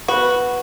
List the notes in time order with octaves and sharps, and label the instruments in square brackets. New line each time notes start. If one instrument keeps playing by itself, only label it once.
[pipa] F#4 [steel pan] B4